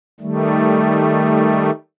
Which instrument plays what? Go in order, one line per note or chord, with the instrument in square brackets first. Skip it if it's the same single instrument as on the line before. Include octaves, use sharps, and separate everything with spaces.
[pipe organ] D#3 G3 A3